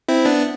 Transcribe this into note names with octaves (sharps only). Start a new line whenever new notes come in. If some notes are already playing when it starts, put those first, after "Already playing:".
C4 E4
B3 D4